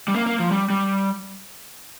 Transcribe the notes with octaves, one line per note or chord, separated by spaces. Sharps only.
G3
A#3
A#3
F3
G3
G3